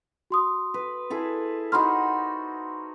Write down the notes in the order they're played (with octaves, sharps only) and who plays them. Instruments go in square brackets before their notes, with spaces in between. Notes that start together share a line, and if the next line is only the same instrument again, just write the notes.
[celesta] F#4 C6 D#6
[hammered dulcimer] B4
E4 G#4 A4
[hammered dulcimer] D#4 F#4 C5 [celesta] B5 C6 F6